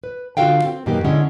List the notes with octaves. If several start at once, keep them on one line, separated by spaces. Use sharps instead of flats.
B4
D3 F4 F#4 A4 F5 G5
C4
F#2 B2 D#3 A#3 B3 G4
D3 G#3 C#4 E4 F#5